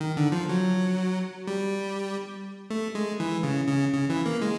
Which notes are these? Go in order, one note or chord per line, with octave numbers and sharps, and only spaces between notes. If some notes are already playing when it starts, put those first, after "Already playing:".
D#3
D3
F3
F#3
G3
A3
G#3
E3
C#3
C#3
C#3
E3
A#3
G#3